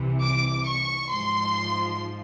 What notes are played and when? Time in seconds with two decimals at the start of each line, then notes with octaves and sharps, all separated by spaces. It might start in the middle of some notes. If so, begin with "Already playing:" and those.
Already playing: C2 C3 E3
0.22 D6
0.66 C#6
1.11 G#2 F3 C6